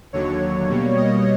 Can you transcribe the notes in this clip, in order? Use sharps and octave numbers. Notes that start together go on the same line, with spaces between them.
D#2 D3 F#3 C#5
B2 G3 A#3
D#5